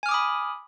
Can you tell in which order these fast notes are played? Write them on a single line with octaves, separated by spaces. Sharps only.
G#5 F6 D6 D#6 B5